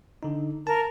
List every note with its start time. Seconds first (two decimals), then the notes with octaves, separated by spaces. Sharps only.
0.23 D3 D#4
0.67 A#4 A5